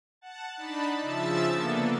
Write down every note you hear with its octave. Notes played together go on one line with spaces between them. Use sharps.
F#5 A5
D4 D#4 A5 B5
C#3 F3 E5 A5 E6 A6
D3 A#3 B3 D4 A4